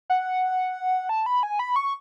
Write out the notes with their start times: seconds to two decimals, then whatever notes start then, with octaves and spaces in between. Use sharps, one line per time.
0.10 F#5
1.09 A5
1.26 B5
1.43 G#5
1.59 B5
1.76 C#6